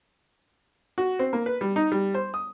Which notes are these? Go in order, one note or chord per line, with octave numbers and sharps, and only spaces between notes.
F#4
C4
A#3
B4
G3
D#4
G3
C5
D#6